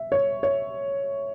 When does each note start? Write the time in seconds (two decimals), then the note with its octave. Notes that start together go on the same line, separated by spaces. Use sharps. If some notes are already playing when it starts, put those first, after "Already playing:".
Already playing: E5
0.12 C#5
0.43 C#5